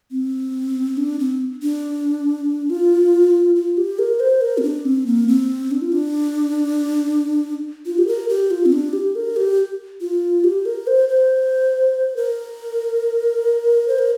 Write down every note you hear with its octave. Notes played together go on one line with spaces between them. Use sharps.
C4
D4
C4
D4
F4
F4
G4
A#4
C5
A#4
C4
D4
C4
A#3
C4
D4
F4
D4
F4
G4
A#4
G4
F4
C4
D4
G4
A#4
G4
F4
G4
A#4
C5
C5
A#4
C5
A#4